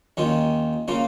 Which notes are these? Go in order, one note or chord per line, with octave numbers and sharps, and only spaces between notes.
D#2 D#3 C#4 F4
C#3 A#3 C#4 F4